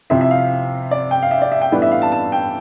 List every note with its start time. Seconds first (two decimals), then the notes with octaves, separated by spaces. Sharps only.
0.10 C3 F3 C4 E4 E5
0.21 E5
0.31 F5
0.91 D5
1.11 G5
1.22 F5
1.31 E5
1.42 D5
1.52 E5
1.62 G5
1.72 A2 E3 G3 B3 D4
1.82 E5
1.91 F5
2.02 A5
2.12 A5
2.32 G5